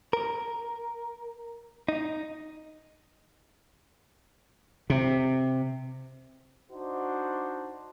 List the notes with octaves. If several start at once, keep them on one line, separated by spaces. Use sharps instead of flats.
A#4
D#4
C3
D4 D#4 F#4 C5